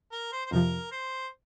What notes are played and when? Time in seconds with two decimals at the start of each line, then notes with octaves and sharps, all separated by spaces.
0.12 A#4
0.32 C5
0.46 C5
0.51 F2 C3 F3 A#4
0.91 C5